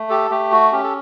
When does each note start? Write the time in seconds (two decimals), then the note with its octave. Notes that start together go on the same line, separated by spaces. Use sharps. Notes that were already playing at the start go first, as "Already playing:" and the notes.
Already playing: A3
0.10 G4 A4
0.30 A3 G4
0.52 F#4
0.72 C#4 G4
0.84 A4